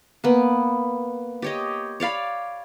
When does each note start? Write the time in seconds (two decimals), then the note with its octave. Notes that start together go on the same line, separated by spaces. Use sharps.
0.24 A#3 B3
1.42 G4 C#5 D#5
2.00 C#5 D5 F5 B5